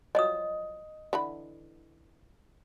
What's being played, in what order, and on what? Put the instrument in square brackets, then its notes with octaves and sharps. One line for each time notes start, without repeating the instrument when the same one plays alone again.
[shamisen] F3 F#3 [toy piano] D#5 D#6
[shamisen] D3 E3 B5